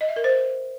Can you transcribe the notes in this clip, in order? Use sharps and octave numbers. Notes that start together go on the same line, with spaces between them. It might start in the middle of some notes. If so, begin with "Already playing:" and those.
D#5
E5
A#4
C5